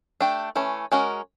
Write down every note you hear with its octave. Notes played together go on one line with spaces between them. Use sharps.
A3 D4 G4
E3 A3 C#4
G#3 C#4 F#4 A#4